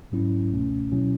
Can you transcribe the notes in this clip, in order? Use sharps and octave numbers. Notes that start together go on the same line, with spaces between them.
G#2 F#3 C#4 E4
C#2 B2 A3 C#4
B2 F#3 C#4 E4